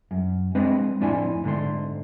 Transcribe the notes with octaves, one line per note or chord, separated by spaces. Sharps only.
F#2
G#3 C4 D4 B4 D#5
F2 A2 D4 E4 G#5 C6
G#2 D3 A3 C6